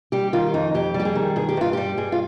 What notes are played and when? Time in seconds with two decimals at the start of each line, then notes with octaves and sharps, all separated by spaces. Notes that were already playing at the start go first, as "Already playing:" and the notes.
0.12 G3 G4
0.33 D#3 F4
0.54 F2 D#4
0.74 F2 G4
0.94 G3
1.00 G4
1.05 G#4
1.15 D#3
1.36 G2 G#4
1.49 G4
1.57 G2 F4
1.73 G3 G4
1.98 G2 G#4
2.12 F4